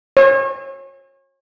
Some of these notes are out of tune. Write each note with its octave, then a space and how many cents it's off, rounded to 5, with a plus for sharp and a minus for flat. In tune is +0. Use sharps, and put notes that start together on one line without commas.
C#5 -35